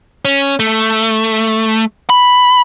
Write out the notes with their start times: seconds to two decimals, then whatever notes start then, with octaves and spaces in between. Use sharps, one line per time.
0.25 C#4
0.60 A3
2.10 B5